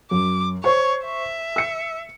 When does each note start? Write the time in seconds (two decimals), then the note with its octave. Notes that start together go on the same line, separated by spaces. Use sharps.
0.11 F#2 D6
0.64 C5 C#5 C#6
1.05 E5
1.56 E6 C#7